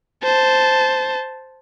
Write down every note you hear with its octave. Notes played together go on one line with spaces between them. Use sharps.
C5 A5